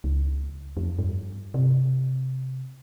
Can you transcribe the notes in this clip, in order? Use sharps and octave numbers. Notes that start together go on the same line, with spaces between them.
C#2
F2
G2
C3